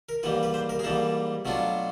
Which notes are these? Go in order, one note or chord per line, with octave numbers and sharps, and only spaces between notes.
A#4
G#2 E3 G3 A#3 B4
B4
C5
A#4
G#4
G#2 E3 G3 A#3 A4
B2 F#3 A3 D4 F4